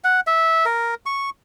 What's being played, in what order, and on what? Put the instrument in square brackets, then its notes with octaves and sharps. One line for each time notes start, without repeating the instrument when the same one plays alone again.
[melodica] F#5
E5
A#4
C#6